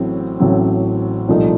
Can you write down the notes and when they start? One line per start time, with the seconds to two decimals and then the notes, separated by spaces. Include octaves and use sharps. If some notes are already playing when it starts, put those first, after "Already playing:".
Already playing: A1 A2 F#3 C4
0.40 A1 A2 F#3 C4
1.28 C2 A#2 F3 A3 D#4